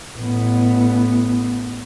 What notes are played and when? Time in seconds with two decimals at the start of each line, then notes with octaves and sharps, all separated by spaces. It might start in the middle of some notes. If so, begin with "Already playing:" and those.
0.17 A1 B3